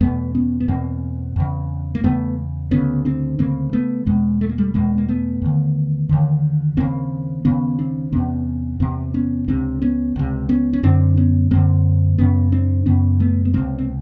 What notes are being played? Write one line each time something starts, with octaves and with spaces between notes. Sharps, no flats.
E2 B2 A3 B3
B3 C#4
B3
E2 B2 A#3 C4
E2 C#3
A#3
E2 C#3 A3 B3
D2 C#3 B3 C#4
C4 D4
D2 C#3 A#3 C4
A3 B3
E2 B2 G#3 A#3
A3
A#3
G3 A3
E2 B2 G#3 A#3
A#3
A3 B3
D#2 D3
D#2 D3
D#2 C#3 A#3 C4
D#2 C#3 B3 C#4
C4 D4
E2 C3 B3 C#4
E2 C3 A#3 C4
B3 C#4
C#2 C3 C4 D4
B3 C#4
C#2 C3
B3 C#4
C#4
F#2 D3 C4 D4
B3 C#4
F#2 D3 A#3 C4
F#2 C#3 B3 C#4
C4 D4
F#2 C#3 B3 C#4
A3 B3
B3
C#2 C3 A#3 C4
C4